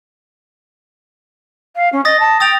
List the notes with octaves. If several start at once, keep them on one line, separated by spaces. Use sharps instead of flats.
F5
C#4
D#5 D#6 A6 A#6
A5
G5 D#6 A6 F7